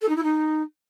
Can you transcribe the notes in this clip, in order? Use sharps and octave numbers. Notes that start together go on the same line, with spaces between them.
A4
D#4
E4
D#4